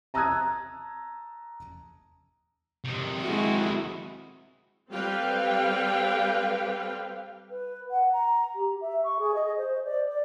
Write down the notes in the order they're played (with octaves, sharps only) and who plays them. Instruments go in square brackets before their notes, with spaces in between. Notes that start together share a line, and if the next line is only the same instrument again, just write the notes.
[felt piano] A5 A#5 D#6 E6 F#6 G#6
[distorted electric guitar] C3 D#3
[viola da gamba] G#3 E4 F#4
[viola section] G3 C4 A4 B4 F5 G5
[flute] B4
F#5
A#5
G4
E5
C#6
G#4
D#5
C5
D5
D5